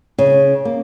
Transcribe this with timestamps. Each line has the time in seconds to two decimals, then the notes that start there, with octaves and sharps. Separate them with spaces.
0.18 C#3
0.65 A#3